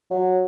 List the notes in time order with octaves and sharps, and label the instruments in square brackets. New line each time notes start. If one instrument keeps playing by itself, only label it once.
[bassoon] F#3